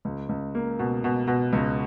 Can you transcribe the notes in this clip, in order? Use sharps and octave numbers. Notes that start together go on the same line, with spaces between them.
C#2
C#2
A#3
B2
B2
B2
C#2